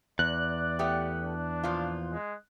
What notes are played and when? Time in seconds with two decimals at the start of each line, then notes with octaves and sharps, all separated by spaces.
0.19 E2 D5 F#6
0.79 A3 B3 G4
1.23 D4
1.63 A#2 F3 F4
2.12 G#3